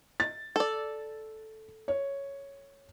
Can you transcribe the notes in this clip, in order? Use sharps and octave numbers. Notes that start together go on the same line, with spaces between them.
A6
A4 D5
C#5